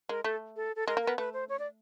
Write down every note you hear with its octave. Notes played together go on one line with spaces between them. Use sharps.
G#3 A#4
A3 A4
A4
A4
G#3 A#4
A#3
B3 A#4
A3 B4
C5
C#5
D5